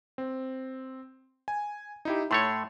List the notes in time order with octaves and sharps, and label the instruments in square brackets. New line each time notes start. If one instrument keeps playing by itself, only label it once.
[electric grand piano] C4
G#5
D#4 E4 G4
[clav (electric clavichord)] A2 A3 C#5 [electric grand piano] C6